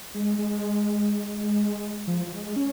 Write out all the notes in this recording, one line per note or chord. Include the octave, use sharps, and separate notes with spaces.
G#3
G#3
F3
F3
G#3
C#4